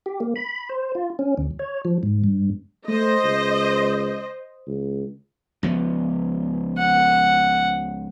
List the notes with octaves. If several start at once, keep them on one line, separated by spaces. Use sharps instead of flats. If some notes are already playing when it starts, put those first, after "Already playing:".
G4
A#3
B5
C5
F4
C#4
D2
C#5
F3
G#2
G2
A3 C5 D#5
C#2
C#2
C#2 F3 B3
F#5